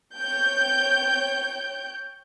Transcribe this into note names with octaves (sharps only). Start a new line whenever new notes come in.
C#5 G5 G6